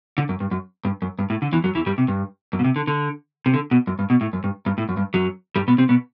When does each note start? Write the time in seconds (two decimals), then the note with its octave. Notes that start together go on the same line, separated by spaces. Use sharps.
0.18 D3
0.29 F#2
0.40 G2
0.51 F#2
0.85 G2
1.02 F#2
1.19 G2
1.30 A2
1.42 D3
1.52 E2 E3
1.64 F#2 F#3
1.75 E2 E3
1.86 G2 G3
1.98 C3
2.08 G2
2.53 F#2
2.59 B2
2.64 C3
2.76 D3
2.87 D3
3.46 C3
3.54 D3
3.71 B2
3.87 F#2
3.99 G2
4.10 B2
4.21 A2
4.33 F#2
4.44 G2
4.66 G2
4.78 A2
4.89 F#2
4.97 G2
5.14 F#2 F#3
5.56 G2 G3
5.68 B2 B3
5.78 C3 C4
5.89 B2 B3